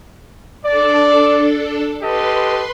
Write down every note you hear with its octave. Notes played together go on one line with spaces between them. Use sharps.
D4 A4 D5
G4 A4 B4 D#5 C6